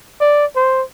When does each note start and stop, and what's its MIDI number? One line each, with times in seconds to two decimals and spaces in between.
0.21 0.46 74
0.56 0.83 72